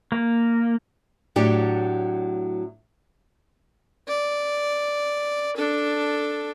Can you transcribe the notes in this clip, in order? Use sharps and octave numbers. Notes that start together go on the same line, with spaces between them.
A#3
A2 F#3 D4 G4
D5
D4 A4